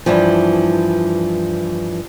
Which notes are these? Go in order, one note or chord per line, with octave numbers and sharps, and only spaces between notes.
G2 E3 F3